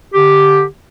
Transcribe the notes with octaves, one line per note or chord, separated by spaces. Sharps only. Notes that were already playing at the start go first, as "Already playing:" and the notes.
D3 G4